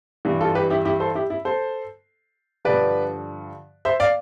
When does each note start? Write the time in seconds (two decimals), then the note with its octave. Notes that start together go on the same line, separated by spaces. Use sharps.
0.25 G2 E3
0.40 F4 A4
0.55 G4 B4
0.70 E4 G4
0.85 E4 G4
1.00 A4 C5
1.15 E4 G4
1.30 E4
1.45 A4 C5
2.65 G2 D3 F3 B4 D5
3.85 C5 E5
4.00 D5 F5